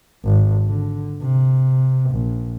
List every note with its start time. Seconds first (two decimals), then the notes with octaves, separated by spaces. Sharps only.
0.24 G#1
0.66 D3
1.22 C3
2.10 A#1